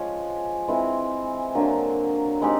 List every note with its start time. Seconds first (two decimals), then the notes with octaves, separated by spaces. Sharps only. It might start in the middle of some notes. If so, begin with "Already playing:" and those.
Already playing: F3 G#3 C#4
0.68 E3 G#3 C4
1.55 D3 F#3 A#3
2.42 G#3 C4 D#4 G4